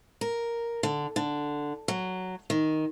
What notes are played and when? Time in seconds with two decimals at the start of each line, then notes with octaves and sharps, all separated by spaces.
0.21 A#4
0.83 D3
1.16 D3
1.88 F#3
2.50 D#3